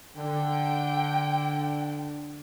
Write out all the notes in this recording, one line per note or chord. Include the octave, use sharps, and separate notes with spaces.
D3 G5